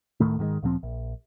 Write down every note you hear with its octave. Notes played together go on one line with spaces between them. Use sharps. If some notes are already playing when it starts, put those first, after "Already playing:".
D1 A2 D#3 A3
G#2 D#3 F#3 G#3
D2 A#2 F3 C4
A#1